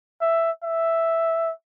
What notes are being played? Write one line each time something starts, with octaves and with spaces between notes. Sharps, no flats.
E5
E5